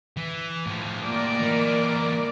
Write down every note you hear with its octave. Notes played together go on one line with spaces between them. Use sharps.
E3
A2 F3
A#3 A#4 D5
E3 D#4